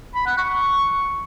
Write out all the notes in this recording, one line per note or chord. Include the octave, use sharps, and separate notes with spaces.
B5
F#5
C#6